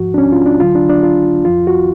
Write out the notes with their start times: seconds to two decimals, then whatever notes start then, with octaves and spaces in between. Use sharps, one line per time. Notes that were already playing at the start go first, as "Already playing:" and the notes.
Already playing: G#2 F3 F#4
0.14 D4
0.18 C#4
0.32 F4
0.46 D4
0.60 D2 D3 F#3 F4
0.75 D4
0.89 D4
1.03 F4
1.45 F2 F3 F4
1.67 F#4